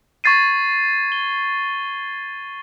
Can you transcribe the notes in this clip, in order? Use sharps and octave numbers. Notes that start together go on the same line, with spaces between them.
C#6 G#6 A6 C7 D#7
G7